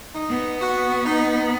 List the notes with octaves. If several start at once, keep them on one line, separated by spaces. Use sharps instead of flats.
D#4
B3
F#4
D#4